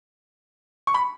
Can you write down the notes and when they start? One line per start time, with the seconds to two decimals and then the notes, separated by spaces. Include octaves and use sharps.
0.87 C#6
0.94 B5